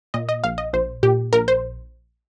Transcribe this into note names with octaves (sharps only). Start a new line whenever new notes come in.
A#2 D#5
D#5
A#1 F5
D#5
A#1 C5
A#2 G4
A#1 A#4
C5